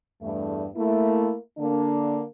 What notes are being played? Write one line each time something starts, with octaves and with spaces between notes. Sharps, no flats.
E2 G2 A3
A3 A#3 E4
D3 A#3 D4